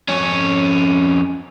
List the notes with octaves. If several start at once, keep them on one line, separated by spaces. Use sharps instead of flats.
F2 C#4